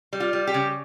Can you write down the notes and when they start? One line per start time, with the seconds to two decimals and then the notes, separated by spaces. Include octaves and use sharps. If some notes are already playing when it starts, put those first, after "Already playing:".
0.13 G3
0.20 F4
0.33 G3
0.47 G4
0.54 C#3